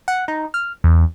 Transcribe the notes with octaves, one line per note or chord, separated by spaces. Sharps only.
F#5
D#4
F6
E2